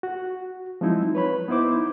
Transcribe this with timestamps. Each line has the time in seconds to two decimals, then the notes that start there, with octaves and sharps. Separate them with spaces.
0.03 F#4
0.81 F3 F#3 G#3 C4 D#4 E4
1.15 B4 C#5 B5
1.48 B3 D#4 E4 C5 D6